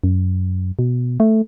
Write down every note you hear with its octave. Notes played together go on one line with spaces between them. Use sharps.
F#2
B2
A3